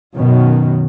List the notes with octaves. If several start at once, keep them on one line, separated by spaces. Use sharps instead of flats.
F#2 B2 D#3